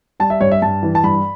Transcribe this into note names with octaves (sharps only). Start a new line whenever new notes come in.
G3 A5
E5
G2 C#5
E5
G2 A5
E3
A5
G2 B5